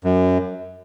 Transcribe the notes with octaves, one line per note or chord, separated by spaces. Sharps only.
F#2